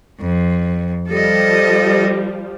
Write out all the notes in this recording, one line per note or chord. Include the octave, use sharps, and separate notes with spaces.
F2
F3 G3 A4 D#5